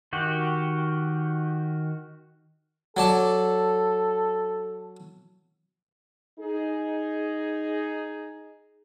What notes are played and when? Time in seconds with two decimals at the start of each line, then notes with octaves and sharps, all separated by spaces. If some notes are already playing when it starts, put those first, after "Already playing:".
0.13 D#3 F#4 G4
2.97 F#3 A4 D5 A5
6.39 D#4 G#4